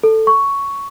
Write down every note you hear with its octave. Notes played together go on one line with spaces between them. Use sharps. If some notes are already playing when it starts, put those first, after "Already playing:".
A4
C#6